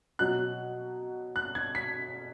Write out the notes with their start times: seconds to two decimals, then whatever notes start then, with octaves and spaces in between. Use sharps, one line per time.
0.19 B2 F#3 F#6
1.36 F#6
1.55 G#6
1.75 B6